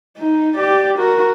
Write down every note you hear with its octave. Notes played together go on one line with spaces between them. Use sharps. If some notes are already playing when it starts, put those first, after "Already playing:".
D#4
G4 D5
F#4 A#4